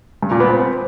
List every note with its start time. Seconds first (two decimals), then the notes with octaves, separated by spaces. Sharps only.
0.23 G2
0.31 A#2
0.40 B3
0.49 C4